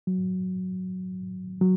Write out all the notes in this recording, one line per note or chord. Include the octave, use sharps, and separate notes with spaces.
F#3
F#3